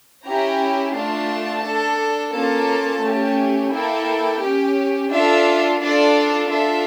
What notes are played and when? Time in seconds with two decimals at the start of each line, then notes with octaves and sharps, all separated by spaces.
0.25 C#4 E4 G4 A#5
0.94 A3 D4 F4 A5
1.64 D4 A4
2.33 A#3 C#4 F4 A4 A5
3.02 A3 C#4 G4
3.72 A#3 E4 A4 G5
4.41 C#4 G4
5.11 D4 F4 A4 E5
5.80 D4 F4 A4 D5
6.50 D4 F4 A4 E5